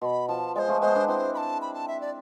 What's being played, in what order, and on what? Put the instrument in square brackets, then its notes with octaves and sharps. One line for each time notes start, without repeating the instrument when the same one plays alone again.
[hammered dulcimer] B2 [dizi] C6
[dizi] B5
[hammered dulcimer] F3 [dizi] A5
[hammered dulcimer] G#3 [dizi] C5 D5
[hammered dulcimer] F3 A3
[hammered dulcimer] G#3 B3 [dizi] C5
[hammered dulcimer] B3 D4
[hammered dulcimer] C4 E4 [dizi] C5
[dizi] B5
A5
B5
A5
E5
D5